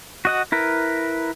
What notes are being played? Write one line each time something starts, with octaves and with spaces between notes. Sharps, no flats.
F#4 D#5 F#5
E4 A#4 B4